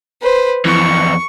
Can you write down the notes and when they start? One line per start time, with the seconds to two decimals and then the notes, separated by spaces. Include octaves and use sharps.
0.22 B4 C5
0.65 F2 E3 C#6